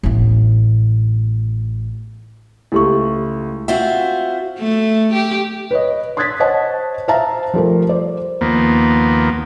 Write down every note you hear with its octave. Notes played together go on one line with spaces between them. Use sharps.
A1 B3
C#2 A3 E4 G4 C#6
C4 F4 F#4 E5
A3
G4
B4 C#5 D#5
C6 D#6 F#6 G#6 A6 B6
C5 C#5 D#5 F#5 A5
C5 E5 F5 A5 A#5
F3 G3 A3 A#4
C5 D5
D#2 F3 A#3 B3